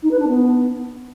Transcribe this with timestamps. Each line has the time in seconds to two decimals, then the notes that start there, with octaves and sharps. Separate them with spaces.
0.02 D#4
0.11 B4
0.19 D4
0.28 B3